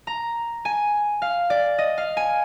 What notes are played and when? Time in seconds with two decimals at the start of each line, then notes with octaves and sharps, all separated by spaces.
0.07 A#5
0.65 G#5
1.22 F5
1.50 D5
1.78 D#5
1.98 F5
2.17 G#5